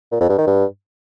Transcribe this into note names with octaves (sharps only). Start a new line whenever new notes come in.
A#2
F2
G2
D#3
G2